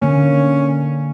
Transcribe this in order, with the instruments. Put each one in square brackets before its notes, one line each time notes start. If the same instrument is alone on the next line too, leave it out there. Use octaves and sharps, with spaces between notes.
[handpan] D3 A#3 [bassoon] C#4